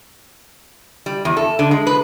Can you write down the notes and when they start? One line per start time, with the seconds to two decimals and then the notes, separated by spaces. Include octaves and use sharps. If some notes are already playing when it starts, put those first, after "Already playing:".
1.06 G3
1.25 E2
1.37 A4
1.59 D3
1.71 G#3
1.87 B4